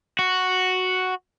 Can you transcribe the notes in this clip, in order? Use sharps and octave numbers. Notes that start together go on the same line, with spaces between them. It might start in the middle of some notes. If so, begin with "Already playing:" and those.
F#4